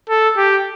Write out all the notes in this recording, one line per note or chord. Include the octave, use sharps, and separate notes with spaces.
A4
G4